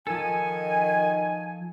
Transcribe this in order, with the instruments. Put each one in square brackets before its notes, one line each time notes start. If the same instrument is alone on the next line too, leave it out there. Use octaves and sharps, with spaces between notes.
[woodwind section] D#3 G#5 [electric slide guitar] F3 A4